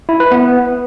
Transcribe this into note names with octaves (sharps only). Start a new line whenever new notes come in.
E4
B4
B3